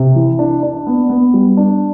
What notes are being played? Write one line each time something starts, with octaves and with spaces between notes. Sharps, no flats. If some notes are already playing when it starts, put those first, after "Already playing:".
Already playing: C3
E3
D4
D4
B3
B3
G3
D4